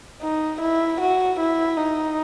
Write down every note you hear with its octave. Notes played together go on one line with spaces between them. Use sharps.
D#4
E4
F#4
E4
D#4